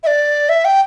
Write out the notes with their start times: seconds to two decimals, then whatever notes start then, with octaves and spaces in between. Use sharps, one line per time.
0.03 E5
0.07 D5
0.49 E5
0.65 G5